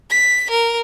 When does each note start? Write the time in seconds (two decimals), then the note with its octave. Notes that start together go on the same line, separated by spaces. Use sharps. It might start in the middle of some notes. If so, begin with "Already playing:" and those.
0.10 B6
0.50 A#4